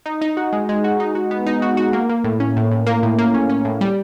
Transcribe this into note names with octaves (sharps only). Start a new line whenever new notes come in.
D#4
D#4
F#4
G#3
G#3
F#4
D#4
F#4
B3
D#4
F#4
F#4
A#3
A#3
A2
C#4
A2
A2
A#3
A2
A#3
C#4
C#4
A2
G3